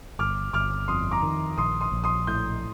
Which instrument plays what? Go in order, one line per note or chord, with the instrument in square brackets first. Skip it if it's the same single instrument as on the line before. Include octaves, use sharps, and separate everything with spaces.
[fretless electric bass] G1 [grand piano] D6 F6
[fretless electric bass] G1 [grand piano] D6 F6
[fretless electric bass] F2 [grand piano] C6 D#6
[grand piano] A#5 D6
[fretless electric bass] D#3
[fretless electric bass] A#1 [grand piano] C6 D#6
[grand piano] C6 D#6
[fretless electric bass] A#1
[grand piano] C6 D#6
[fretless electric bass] A2 [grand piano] D#6 G6